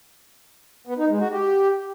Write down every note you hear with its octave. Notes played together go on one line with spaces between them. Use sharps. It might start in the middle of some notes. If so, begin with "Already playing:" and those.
B3
D#4
G#3
F#4
G4